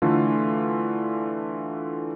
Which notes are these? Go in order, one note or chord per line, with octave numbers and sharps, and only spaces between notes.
D3 E3 A3 F4